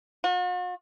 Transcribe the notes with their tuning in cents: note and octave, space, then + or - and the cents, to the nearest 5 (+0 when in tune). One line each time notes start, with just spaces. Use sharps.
F#4 -45